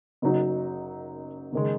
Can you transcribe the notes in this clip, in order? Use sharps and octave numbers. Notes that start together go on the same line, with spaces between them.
F#1 F#2 F#3 D#4
F#1 D#3 G#3